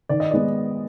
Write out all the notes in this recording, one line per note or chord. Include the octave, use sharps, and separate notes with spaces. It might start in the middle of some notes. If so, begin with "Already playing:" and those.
D#3 D5
D#5
G#3 B3 D5